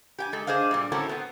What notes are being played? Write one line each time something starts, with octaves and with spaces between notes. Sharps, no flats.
G4 G5 G#5
G#3 A4
D4 G#4 C5 D#5 F5
G2 A#2 G3
A2 C4 C#4 F#4 A4 A#4
B3 C4